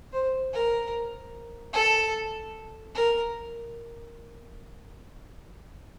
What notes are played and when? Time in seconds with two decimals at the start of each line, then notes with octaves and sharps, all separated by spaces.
0.13 C5
0.53 A#4
1.73 A4
2.95 A#4